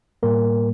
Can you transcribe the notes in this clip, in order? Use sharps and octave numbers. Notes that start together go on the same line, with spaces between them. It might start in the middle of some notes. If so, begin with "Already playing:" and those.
A2 G3 A#3 A#4